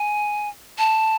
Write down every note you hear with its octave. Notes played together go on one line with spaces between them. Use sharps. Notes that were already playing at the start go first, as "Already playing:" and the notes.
Already playing: G#5
A5